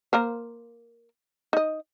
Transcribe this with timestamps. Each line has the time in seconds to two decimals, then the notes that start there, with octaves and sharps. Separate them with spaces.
0.13 A#3 A#4 C5
1.53 D#4 D#5